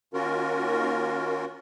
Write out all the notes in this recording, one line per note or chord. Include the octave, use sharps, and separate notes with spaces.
D#3 A#3 C#4 F4 F#4 A#4